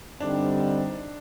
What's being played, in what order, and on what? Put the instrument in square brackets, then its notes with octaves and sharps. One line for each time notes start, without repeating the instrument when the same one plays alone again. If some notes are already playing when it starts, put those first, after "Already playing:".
[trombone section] G2 D3 G3 C4 D#4 [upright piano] D4